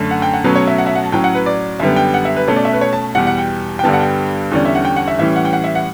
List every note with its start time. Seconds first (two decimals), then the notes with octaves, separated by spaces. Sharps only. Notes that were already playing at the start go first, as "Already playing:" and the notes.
Already playing: F#2 D3 A3 C#4
0.11 F#5
0.22 G5
0.34 F#5
0.44 B2 F#3 A3 C#4 B4
0.56 C#5
0.67 E5
0.78 F#5
0.86 E5
0.95 F#5
1.04 A5
1.12 A2 F#3 C#4 G5
1.24 F#5
1.35 B4
1.46 D5
1.80 F#2 D3 G3 B3 E5
1.96 G5
2.14 F#5
2.25 E5
2.36 B4
2.48 B2 A3 C#4 C#5
2.56 D5
2.65 E5
2.73 B4
2.81 C#5
2.93 A5
3.15 E2 B2 G3 F#5
3.27 F#5
3.38 G5
3.79 G5
3.83 G2 D3 G3 B3 A5
3.93 F#5
4.00 G5
4.51 E2 D3 G3 C#4 D5
4.65 E5
4.75 F#5
4.85 G5
4.96 F#5
5.08 E5
5.18 A2 E3 G3 C#4 E5
5.36 F#5
5.45 G5
5.53 F#5
5.64 E5
5.75 F#5